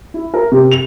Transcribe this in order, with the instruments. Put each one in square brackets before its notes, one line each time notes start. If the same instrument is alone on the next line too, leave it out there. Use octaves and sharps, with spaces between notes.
[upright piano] E4
A#4
C3
F7